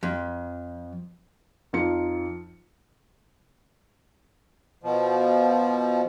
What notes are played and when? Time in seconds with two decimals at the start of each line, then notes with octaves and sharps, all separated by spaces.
0.03 F2
1.73 F2 D#4 F4 C#7
4.83 B2 F3